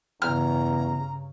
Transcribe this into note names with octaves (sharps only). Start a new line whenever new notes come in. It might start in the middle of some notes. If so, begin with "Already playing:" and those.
E2 G2 C#3 A#5 F6